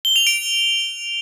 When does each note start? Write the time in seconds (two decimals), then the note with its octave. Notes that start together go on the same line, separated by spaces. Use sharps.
0.05 G7
0.16 F7
0.27 D7